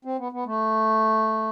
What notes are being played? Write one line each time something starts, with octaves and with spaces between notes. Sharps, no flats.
C4
B3
B3
A3